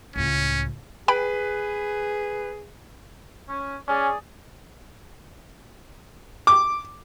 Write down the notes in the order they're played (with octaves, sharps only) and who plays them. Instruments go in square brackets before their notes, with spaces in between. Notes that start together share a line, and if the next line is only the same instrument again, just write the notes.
[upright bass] C#2 A2 [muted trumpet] C#4
[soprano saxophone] G#4 [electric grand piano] B4 [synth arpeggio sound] G5 G#5 B5
[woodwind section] C#4
[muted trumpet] C#4 [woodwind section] G#4 D5
[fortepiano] D6